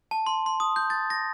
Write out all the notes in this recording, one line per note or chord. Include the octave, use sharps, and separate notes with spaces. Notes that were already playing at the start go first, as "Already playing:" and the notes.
A5
C6
C6
D#6
G6
A6
A#6